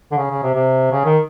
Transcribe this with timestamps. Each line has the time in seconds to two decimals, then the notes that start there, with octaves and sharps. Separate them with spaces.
0.12 D3
0.17 C#3
0.31 C#3
0.43 C3
0.55 C3
0.92 C#3
1.05 D#3